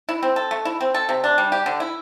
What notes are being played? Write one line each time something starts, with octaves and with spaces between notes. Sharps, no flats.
E4
C4
A4
A3
E4
C4
A4
C3
D4
G3
G4
D3
E4